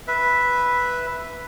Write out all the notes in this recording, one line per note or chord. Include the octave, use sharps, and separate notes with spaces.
B4 E5